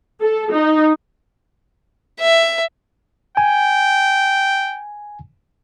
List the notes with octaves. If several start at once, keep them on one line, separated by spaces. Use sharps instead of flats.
A4
D#4
E5
G5 G#5